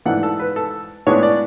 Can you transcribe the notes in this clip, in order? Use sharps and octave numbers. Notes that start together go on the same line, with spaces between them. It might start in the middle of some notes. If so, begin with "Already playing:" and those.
G#2 E3 A3 D4 F#5
A4
B4
A4
A2 G#3 B3 D4 C#5
D5